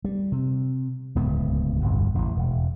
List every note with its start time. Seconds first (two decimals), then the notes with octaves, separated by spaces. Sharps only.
0.04 G3
0.32 C3
1.15 D1 C#2 G2 B3
1.81 G1 C2 F2
2.14 A1 E2
2.37 E1